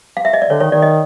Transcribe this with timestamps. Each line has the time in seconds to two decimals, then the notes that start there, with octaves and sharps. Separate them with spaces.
0.17 F5
0.25 E5
0.33 D#5
0.42 D5
0.50 D3 C#5
0.60 D#3 C#5
0.71 D#3 D5
0.82 D#5